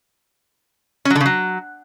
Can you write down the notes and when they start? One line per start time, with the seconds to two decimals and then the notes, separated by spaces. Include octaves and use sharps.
1.05 C#4
1.10 F#3
1.15 D3
1.20 C#3
1.25 F#3